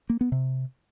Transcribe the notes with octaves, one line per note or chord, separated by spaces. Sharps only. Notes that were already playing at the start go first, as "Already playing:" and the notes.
A#3
B3
C3